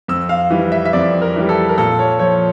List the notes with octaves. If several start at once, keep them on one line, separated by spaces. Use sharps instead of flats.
F2 E6
F5
E3 G3
E5
E5
F2 D5
A#4
E3 G3
A4
A#4
A#2 A4
C#5
F3 C#5